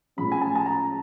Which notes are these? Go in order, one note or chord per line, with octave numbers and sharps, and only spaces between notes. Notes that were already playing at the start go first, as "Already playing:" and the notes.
A2 F3 G#3 C#4 B5
G#5
A5
A5
A#5